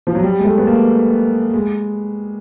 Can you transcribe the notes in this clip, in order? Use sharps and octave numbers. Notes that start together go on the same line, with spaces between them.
F3
F#3
G3
G#3
A3
B3
A#3
G#3